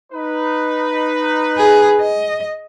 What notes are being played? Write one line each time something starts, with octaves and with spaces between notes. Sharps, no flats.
D#4 B4
G#4
D#5